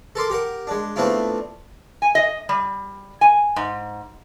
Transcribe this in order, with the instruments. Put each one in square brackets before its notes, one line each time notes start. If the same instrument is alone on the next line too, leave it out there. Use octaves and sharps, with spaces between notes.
[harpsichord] A4 A#4 C6 D6
G4 A#4 F#5
G#3 D4
A3 B3 C4 D4 E4 F4
[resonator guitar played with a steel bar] G#5
D#5
G3
G#5
G#2